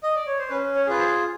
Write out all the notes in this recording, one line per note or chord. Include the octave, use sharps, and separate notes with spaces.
D#5
D5
C#5
C5
C#4 B4
C#5
F4 G#4 B4
C5